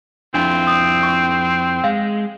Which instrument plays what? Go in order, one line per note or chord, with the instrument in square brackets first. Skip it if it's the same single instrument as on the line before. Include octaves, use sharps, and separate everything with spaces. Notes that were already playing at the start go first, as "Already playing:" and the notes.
[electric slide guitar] F2 E4 F4 [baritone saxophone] C4 [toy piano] D4
[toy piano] D#6
C#6
[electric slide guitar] G#3 [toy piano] F5